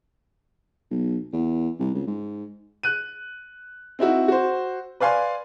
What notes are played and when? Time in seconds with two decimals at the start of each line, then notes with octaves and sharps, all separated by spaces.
0.91 B1
1.33 E2
1.80 C2
1.94 C#2
2.07 G#2
2.83 F#6 D#7
3.99 C4 D#4 E4 F#4
4.28 F#4 C5
5.00 B4 D5 F5 G#5 C6